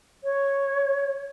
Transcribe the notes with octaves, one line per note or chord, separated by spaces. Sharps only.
C#5